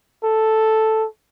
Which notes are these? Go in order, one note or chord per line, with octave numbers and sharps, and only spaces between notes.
A4